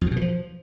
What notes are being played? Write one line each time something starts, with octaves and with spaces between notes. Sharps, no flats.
F2
G#2
B2
E3
F3